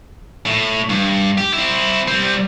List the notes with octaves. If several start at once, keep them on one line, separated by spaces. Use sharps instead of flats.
A2
G2
G4
C4 E4
G3 C4